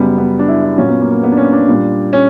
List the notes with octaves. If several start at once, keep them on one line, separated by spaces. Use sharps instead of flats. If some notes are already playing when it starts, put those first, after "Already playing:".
Already playing: F#2 C#3 G3 B3
B3
D4
E4
E4
A#2 F#3 C#4
B3
A#3
A#3
B3
D4
C#4
D4
A#2 G3
C#4